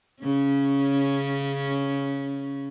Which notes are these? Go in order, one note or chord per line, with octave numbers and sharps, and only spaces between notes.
C#3 C#4